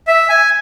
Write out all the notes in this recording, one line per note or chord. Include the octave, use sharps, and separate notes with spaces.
E5
G#5